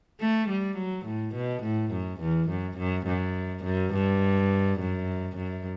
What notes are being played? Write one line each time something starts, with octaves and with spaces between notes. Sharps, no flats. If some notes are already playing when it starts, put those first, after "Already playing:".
A3
G3
F#3
A2
B2
A2
F#2
E2
F#2
F#2
F#2
F#2
G2
F#2
F#2